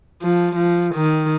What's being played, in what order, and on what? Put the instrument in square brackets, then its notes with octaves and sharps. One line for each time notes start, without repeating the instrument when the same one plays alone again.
[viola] F3
F3
D#3